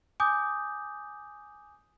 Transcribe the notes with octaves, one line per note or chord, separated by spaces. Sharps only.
G#5 D6 D#6 G6